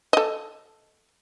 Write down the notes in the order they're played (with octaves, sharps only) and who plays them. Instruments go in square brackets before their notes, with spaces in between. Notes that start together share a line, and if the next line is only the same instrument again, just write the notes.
[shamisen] A4 D#5